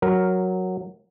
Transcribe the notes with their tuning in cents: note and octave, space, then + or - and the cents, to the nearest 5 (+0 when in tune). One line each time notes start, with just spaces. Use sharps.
F#3 +0 A#4 +0